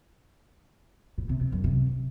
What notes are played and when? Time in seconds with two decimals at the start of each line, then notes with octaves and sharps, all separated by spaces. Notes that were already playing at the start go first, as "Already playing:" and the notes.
1.18 A2
1.29 C3
1.41 C3
1.52 F#2
1.64 C3